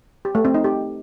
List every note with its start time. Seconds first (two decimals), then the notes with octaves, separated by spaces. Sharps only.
0.25 G4
0.35 A3
0.45 C4
0.55 D#4
0.64 G4